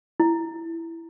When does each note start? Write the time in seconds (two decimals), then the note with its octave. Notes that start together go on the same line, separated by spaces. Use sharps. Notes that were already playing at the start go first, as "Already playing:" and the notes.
0.20 E4